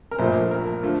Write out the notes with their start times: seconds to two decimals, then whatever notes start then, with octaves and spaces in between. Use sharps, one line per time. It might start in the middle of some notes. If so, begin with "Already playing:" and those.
0.11 A#4
0.19 A#1 A#2 F3 A3 C5
0.51 A#4
0.83 D3 F3 A3